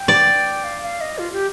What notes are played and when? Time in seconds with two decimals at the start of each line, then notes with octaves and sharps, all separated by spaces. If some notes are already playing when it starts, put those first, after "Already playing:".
Already playing: G5
0.08 D5
0.64 F5
0.82 F5
1.01 D#5
1.18 F4
1.32 G4